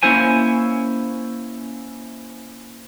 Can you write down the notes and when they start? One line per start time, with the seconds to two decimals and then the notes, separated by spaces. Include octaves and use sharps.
0.03 A#3 C#4 E4 C5 G#5